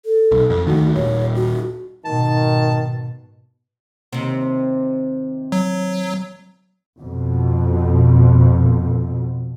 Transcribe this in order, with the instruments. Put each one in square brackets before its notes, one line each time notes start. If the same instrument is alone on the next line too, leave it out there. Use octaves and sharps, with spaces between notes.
[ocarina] A4
[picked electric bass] B1
F2
[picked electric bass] D2 D#3 [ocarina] F#4
[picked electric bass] D#1 [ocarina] C#5
[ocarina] F#4
[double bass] G#1 B2 [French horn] D#3 [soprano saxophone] A5
[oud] D#2 C3
[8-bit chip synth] F#3
[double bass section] F2 B2